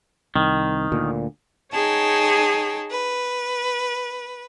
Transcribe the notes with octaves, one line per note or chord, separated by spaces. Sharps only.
C2 D#3
D2 A#2 D3
D#4 G#4 C#5 G5 A5
B4